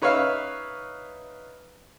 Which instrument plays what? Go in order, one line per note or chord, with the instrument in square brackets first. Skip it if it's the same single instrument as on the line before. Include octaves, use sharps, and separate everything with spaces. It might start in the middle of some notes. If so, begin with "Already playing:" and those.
[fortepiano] D#4 B4 C#5 E5 F5